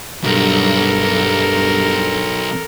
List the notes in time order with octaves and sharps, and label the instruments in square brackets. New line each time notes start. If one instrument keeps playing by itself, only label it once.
[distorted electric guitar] B1 [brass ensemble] G2 [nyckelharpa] A4 A#4